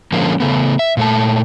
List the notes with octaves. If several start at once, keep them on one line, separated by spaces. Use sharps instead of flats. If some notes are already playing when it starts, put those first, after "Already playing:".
D3 F3 G#3 A#3 C#4
C#3 A3 B3
E5
A#2 A3 A5